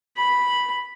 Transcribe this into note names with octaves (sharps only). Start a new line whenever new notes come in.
B5